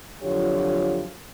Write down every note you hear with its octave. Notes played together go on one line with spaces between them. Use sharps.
F2 D3 F#3 F4 G4 C#5